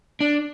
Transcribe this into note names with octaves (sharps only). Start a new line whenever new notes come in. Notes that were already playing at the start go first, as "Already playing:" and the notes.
D4